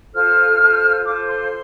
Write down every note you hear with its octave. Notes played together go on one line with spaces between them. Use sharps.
F4 A4 C5 F6
F4 A4 C5
F4 A4 C5 D6
C6